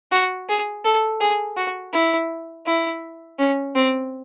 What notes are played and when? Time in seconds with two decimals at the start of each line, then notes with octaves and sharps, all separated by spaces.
0.12 F#4
0.49 G#4
0.85 A4
1.21 G#4
1.57 F#4
1.93 E4
2.66 E4
3.39 C#4
3.75 C4